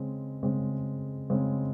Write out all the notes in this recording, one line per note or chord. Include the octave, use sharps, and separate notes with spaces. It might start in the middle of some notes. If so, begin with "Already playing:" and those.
Already playing: C#3 G#3 C4
C#3 G#3 C4
C#3 G#3 C4